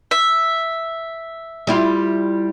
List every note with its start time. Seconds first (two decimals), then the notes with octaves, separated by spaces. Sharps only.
0.11 E5
1.67 G3 E4 F4